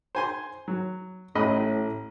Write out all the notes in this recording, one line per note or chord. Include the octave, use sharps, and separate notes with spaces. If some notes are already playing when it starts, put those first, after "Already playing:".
C5 G#5 C6
F#3
A1 A2 D#5 B5